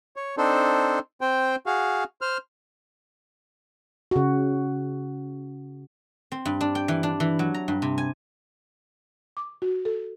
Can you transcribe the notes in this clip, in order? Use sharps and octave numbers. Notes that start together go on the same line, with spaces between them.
C#5
C4 D4 D#4 A4 C5
C4 C5 G5
F#4 G#4 F5
C5 F6
C#3 F#4
C4
G2
D4
G5
E3
D4
E3
F#3
A#5
G2
C3
G#5
D6
F#4
A4